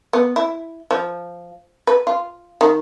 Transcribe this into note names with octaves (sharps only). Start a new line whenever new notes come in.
B3
E4
F3
B4
F4
D#3